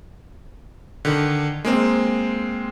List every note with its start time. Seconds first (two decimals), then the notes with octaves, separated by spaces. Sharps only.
1.05 D3 D#3
1.65 G#3 A#3 C4